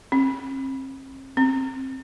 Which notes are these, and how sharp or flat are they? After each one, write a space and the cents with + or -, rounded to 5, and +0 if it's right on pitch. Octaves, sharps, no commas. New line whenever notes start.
C4 +45
C4 +15